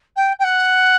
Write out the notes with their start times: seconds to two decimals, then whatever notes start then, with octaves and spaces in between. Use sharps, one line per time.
0.16 G5
0.39 G5
0.44 F#5